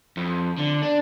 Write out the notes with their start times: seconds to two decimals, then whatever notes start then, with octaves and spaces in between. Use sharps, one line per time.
0.17 F2
0.58 D3
0.82 D4